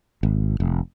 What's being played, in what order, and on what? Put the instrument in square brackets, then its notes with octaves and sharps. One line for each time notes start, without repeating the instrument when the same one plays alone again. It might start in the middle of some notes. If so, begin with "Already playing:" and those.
[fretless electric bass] G#1
F1